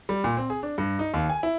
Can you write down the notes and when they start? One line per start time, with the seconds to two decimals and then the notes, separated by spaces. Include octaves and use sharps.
0.09 G3
0.24 A#2
0.37 C4
0.50 G#4
0.63 D4
0.78 G2
0.99 D#4
1.14 D#2
1.30 G#5
1.43 E4